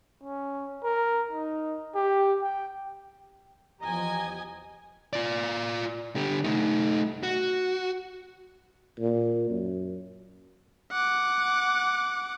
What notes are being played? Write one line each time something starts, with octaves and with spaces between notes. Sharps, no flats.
C#4
A#4
D#4
G4
G5
E2 F3 G4 D#5 G#5 A#5
F4 D5
D3 G4
A3 D#4
F#4
A#2
F#2
F#5 D6